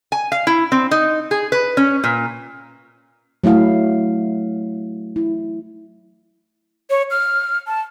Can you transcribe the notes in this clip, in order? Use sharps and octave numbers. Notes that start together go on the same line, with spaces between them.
G#5
F5
E4
C4
D#4
G#4
B4
C#4
A#2
F#3 A3 E4 F5
E4
C#5
F6
A5